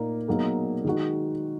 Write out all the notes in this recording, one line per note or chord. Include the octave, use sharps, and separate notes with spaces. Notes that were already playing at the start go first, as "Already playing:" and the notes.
Already playing: A#2 A#3 D#4
B2 F#3 A#3 D#4 G#4
D#3 G#3 D#4 F#4